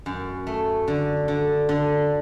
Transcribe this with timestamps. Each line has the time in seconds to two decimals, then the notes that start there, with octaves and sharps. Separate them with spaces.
0.06 F#2
0.47 A3
0.88 D3
1.28 D3
1.69 D3